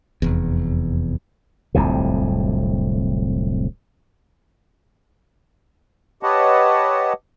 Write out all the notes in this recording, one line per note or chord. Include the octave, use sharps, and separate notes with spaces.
F1 E2
D1 C2 F2 C3
G4 B4 C#5 D#5 F#5 A5